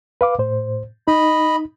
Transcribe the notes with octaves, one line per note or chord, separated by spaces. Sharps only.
B4 F5 D6
A2 C5
D#4 D#5 B5